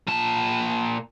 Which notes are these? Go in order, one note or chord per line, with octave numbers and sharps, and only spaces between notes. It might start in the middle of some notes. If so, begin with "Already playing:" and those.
A#2 A5